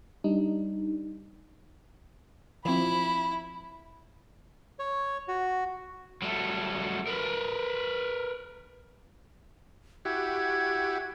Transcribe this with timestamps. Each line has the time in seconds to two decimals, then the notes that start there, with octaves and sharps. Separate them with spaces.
0.24 G3 D4 D#4
2.65 F3 C4 E4 B5
4.79 C#5
5.28 F#4
6.22 F#3 G3 A3
7.07 A#4 B4
10.05 E4 F#4 G4 G#6